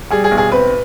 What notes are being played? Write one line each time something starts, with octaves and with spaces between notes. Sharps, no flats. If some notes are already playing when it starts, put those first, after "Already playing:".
G3 G#4
G#4
B1
G#4
C4 B4